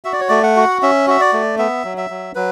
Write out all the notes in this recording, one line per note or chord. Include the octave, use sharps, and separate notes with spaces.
F#4 E5
D5
C#5
A3 D5
F#5
F#4
C#4 E5
F#4 E5
D5
A3
B3 E5
F#3
E5
F#3
F#3 B4